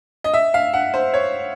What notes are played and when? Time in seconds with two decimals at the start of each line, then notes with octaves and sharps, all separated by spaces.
0.24 D#5
0.34 E5
0.54 F5
0.74 F#5
0.94 C5
1.14 C#5